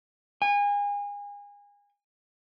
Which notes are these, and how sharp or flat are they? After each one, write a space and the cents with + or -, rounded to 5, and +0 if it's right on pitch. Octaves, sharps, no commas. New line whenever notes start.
G#5 -30